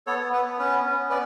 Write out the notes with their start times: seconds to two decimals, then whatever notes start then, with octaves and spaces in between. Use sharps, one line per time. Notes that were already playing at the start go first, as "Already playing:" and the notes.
0.07 B3 A4 C#5
0.33 B3 B4
0.59 C#4 B4
0.85 C#4
1.10 B3 B4 D5